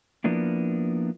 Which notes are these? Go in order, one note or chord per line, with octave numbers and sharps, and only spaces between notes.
F3 A#3 B3 D4 E4